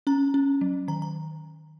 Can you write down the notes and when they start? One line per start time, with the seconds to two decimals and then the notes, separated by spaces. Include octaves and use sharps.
0.07 C#4 A#5
0.34 C#4
0.61 F#3
0.88 D#3 A#5
1.02 A#5